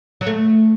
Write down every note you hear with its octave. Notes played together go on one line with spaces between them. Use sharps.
F#3
A3